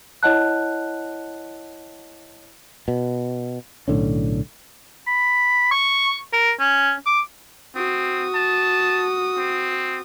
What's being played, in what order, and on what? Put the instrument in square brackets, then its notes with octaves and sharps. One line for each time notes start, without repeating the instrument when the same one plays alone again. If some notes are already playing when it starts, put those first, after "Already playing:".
[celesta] E4 C#5 D#5 F#5 A5 F#6
[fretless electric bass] B2
B1 A2 D3 C#4
[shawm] B5
C#6
A#4
C#4
D6
[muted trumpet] C4 [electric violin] F#4 D#6
[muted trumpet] A5
C4